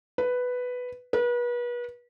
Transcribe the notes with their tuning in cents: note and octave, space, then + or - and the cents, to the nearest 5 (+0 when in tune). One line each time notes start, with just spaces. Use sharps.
B4 +5
B4 -35